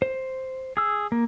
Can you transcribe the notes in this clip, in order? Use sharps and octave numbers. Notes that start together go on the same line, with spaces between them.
C5
G#4 E6
A#3